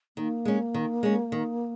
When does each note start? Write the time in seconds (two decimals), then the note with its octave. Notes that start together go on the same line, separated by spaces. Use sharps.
0.17 D#3 A#3
0.45 G#3 C#4
0.74 D#3
1.03 G#3 C#4
1.32 D#3